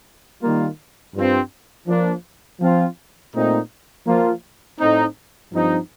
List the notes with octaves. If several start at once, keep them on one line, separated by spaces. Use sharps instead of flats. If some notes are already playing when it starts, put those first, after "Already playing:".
D#3 G3 A#3 F4
G2 F3 C4
F3 A#3 D4
F3 C4 F4
A#2 A3 C4 D#4
F3 A#3 F4
A2 A3 C4 D#4
G2 F3 C4 D#4